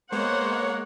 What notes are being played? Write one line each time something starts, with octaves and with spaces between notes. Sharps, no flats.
G#3 A#3 B3 C5 C#5 F#5